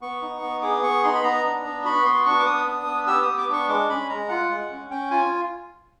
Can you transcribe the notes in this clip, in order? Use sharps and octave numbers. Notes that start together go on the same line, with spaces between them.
B3 C#6
D#4
B3
G#4 D6
B3 C#6
D#4 C6
B5
B3 A#5
D4
B3
F#4 B5
B3 C6
D4 C#6
D6
B3 D#6
D4
B3
G4 E6
D#6
B3
D6
D4 C#6
G#3 D6
C#4 B5
G#3 A#5
F4 F#5
G#3
C#4
C#4 G5
F4 G#5